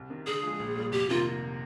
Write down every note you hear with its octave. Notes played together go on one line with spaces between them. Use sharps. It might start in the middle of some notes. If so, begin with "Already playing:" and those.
Already playing: C2
C3 D#3
D3 G#4
F3 G#3
A#1
A#2 G3
F1 G4
C3 D#3 A#3 F4